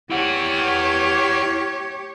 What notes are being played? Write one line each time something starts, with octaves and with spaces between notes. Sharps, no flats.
E4 G4 C#5 F#5